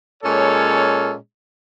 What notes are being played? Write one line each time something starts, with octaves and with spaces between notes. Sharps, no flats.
A#2 G#3 C#4 A4 C#5